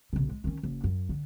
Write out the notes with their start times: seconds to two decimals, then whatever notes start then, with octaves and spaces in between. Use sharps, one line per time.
0.13 B1 C#3
0.29 G#3
0.44 D#3 C#4
0.63 F#1
0.84 F#2
1.09 D3